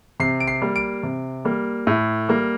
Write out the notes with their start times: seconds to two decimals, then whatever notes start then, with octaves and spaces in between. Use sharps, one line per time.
0.20 C3 C7
0.40 D7
0.47 C7
0.62 G3 A#3
0.76 D7
1.03 C3
1.45 G3 A#3
1.87 A2
2.29 G3 A#3